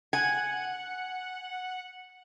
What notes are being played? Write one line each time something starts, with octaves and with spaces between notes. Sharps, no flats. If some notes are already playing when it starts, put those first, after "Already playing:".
F#5 G#5